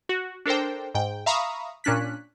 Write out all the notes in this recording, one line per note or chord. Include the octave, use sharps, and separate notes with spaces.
F#4
D4 A4 A#4 C5 G5
G#2 G5
E5 F5 A#5 B5 C#6 D#6
A#2 C#4 D4 F#6 B6